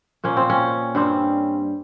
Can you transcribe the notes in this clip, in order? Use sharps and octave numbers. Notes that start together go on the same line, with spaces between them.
A#2 F3 A#3 C#4
C4
C#4
G2 G3 C4